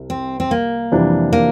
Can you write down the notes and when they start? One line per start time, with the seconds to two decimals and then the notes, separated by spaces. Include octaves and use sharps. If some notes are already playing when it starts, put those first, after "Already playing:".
Already playing: C2 C3
0.10 C4
0.40 C4
0.51 A#3
0.92 F2 C3 E3 G3 D4
1.33 A#3